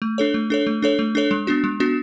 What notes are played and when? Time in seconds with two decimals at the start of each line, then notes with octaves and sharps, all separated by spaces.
0.02 A3
0.18 D4 A4 C#5
0.34 A3
0.50 D4 A4 C#5
0.67 A3
0.82 D4 A4 C#5
0.99 A3
1.15 D4 A4 C#5
1.31 G#3
1.47 B3 D4 F#4
1.64 G#3
1.80 B3 D4 F#4